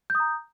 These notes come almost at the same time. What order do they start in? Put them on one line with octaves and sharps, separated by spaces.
G6 D#6 A#5